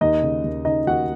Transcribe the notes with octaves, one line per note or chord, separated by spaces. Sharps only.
D#2 D#4 D#5
C#3
D#2
C#3 D#4 D#5
D#2 F#4 F#5